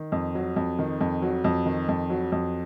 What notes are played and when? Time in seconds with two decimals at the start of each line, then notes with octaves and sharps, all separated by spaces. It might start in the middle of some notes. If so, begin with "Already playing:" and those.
Already playing: D#3
0.12 F2
0.35 F#3
0.56 F2
0.79 D#3
1.01 F2
1.22 F#3
1.44 F2
1.66 D#3
1.89 F2
2.10 F#3
2.32 F2